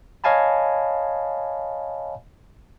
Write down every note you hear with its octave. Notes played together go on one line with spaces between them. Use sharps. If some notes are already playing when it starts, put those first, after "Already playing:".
C#5 D#5 F5 G#5 A5 B5